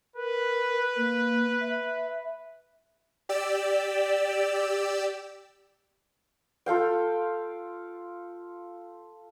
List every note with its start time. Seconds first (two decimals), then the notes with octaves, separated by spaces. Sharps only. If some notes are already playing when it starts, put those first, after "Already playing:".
0.16 A#4 B4
0.96 A#3
1.61 E5
3.29 G4 D5 E6
6.66 F4 A4 F5 G5